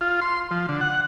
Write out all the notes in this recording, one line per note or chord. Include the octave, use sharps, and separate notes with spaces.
F4
C6
F3
D3
F#5